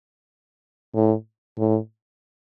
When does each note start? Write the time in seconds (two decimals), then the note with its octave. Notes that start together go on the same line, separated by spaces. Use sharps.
0.94 A2
1.58 A2